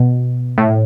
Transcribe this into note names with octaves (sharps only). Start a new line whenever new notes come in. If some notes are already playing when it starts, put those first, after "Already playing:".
Already playing: B2
A2